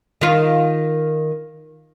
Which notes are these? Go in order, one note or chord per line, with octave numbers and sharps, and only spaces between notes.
D#3 F4